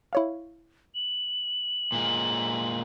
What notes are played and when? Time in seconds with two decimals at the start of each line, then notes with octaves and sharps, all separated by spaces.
0.13 E4 C#5 F5
0.95 F#7
1.92 A#2 G#3